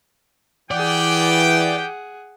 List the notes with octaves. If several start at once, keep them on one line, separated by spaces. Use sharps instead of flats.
E3 G4 G#4 D5 F#5 G5